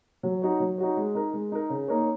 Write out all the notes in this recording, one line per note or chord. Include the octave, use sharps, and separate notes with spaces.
F#3
D#4 F#4 C#5
F#3
D#4 F#4 C#5
G#3
D#4 A#4
G#3
D#4 A#4
C#3
A#3 D#4 A#4 C#5